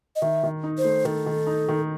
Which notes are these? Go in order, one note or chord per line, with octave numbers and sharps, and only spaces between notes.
D#5
D#3 E5
D#3
D#4
C5
A3
D#3 A4
D#3
D#4
D#3